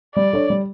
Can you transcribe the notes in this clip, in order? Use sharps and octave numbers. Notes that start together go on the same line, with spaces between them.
G3 D5
D4 A4 C#5
G3